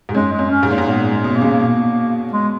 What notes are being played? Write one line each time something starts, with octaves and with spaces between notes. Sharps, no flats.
G#2
F#2 G#3
G#3
F#2
C#4
G#2
A#2
G#2
A#2 B3
G#3
B2
A#3
C#3
B2
G#3